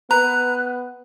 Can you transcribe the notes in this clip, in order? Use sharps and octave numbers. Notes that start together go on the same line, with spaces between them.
B3 B4 A#5 F#6